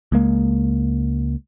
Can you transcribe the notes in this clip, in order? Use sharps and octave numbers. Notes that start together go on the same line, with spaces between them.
C#2 G#3 A#3